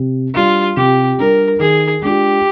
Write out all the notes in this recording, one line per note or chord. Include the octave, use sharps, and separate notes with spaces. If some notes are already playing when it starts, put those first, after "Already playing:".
Already playing: C3
G3 D4 F4
C3 G4
G3 D4 A#4
D#3 G#4
G#3 D4 F4 G4